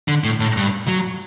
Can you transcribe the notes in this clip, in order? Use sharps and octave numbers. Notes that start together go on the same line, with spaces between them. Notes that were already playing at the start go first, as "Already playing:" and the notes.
D3
A2
A2
G2
F#3